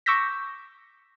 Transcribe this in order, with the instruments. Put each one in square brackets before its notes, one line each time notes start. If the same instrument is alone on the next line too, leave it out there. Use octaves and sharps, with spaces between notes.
[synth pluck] C#6 D6 E6 G6 A#6 B6